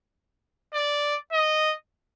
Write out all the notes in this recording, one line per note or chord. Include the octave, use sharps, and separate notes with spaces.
D5
D#5